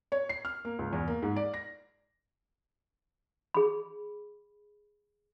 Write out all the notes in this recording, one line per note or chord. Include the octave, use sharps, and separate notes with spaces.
C#5
C7
F6
A#3
C#2
E2
A#3
G#2
D5
A#6
G#4 B5